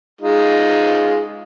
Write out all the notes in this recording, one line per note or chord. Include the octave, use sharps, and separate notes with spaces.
G#3 D#4 F4